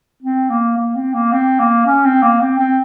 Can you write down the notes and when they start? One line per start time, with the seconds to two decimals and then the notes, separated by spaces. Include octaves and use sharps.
0.23 C4
0.49 A#3
0.77 A#3
0.95 C4
1.14 A#3
1.32 C4
1.59 A#3
1.86 C#4
2.05 C4
2.22 A#3
2.40 C4
2.59 C4